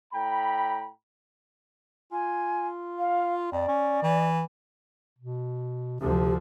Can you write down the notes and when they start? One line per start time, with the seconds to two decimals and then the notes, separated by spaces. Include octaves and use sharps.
0.13 A2 G5 A#5 B5
2.12 F4 G#5
2.98 F5
3.52 F2 D5
3.68 C#4
4.03 E3
5.19 B2
6.00 D2 C3 F3 G4